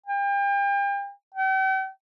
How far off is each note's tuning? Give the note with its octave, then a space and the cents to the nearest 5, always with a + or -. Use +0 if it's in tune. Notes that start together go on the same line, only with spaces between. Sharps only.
G5 +35
G5 -45